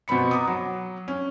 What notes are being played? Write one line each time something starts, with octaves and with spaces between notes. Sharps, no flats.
B2 B3 C4 B5 C#7
A#5 D6 D#6
F#3
C#4